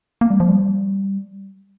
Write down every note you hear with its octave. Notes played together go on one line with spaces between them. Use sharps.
A#3
G3
F3
G3